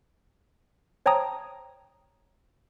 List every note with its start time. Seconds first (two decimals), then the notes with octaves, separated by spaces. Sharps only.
1.06 C5 C#5 G5 A5 A#5 D#6